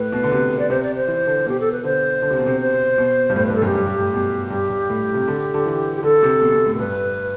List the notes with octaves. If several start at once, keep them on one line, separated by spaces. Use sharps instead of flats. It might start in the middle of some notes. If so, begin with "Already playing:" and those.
Already playing: A2 B4
B2
D3
C3
D5
C3 C5
D5
C5
E3
D3
B2 G4
A4
B4
D3 C5
D3
C3
B2
C3
C5
B2
G2
A2 C5
G2 B4
A4
F#2 G4
G2
G2
A2
B2
G2 G4
G2
A2
C3
D3
D3
E3
G4
D3 A4
C3
B2
C3
B2
A2
A4
G2 B4